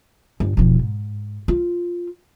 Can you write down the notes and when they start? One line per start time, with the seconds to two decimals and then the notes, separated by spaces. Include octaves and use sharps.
0.40 G1
0.57 E1 F3
0.79 G#2
1.48 F4